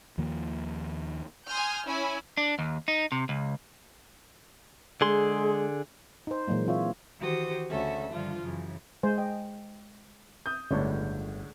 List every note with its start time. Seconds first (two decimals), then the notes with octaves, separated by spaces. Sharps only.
0.18 D#2 D#3 F3 A#3
1.49 G#5 C6 D#6 F6 G6
1.85 C#4 E4 G#5 B5
2.37 D4
2.59 D#2
2.88 D#4
3.12 C3
3.29 C#2
5.01 D3 G#3 G#4 C6
6.27 D#4 C5
6.48 A#2 E3 F#3 G#3 A#3
6.67 E3 C4 F4 C#5 E5
7.19 D#3 E3 F#4 G4 C5 D#6
7.70 D2 C#3 C#4 F#4 A4 E5
8.11 G2 D3 D#3 F3 F4
8.43 F#2 C#3 E3
9.03 G#3 C5 G#5
9.18 C5 D#5 G5
10.46 D#6 G6
10.71 G1 C#2 A2 D3 A4 C#5 D5